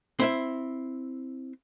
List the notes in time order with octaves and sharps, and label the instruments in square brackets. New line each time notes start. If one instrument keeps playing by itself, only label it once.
[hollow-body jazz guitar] C4 E4 E5